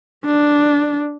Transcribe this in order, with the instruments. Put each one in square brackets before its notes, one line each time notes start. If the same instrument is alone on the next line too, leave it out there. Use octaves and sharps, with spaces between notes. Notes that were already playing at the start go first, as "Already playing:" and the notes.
[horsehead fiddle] D4